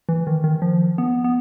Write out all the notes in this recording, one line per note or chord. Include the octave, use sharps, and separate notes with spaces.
E3
D#3
D#3
F3
B3
B3